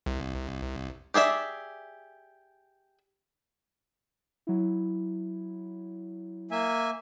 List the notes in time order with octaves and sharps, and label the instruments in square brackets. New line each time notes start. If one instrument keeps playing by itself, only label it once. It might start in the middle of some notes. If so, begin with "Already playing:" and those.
[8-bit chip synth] C2
[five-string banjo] G4 G#4 D5 E5
[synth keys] F#3 E4
[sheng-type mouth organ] A#3 E5 G#5